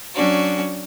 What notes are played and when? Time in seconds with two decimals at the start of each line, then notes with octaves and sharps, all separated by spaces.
0.15 F#3 C#4 D4 F#4